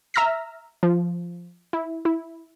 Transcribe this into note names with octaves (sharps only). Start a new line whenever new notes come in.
E5 A#5 E6 F6 A#6 B6
F3
E4
E4